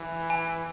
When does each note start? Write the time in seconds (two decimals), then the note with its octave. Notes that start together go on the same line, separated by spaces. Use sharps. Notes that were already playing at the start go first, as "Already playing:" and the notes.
Already playing: E3
0.30 G#5